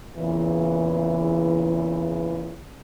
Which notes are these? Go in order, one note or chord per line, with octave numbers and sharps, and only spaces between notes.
E2 A#2 C#3 E3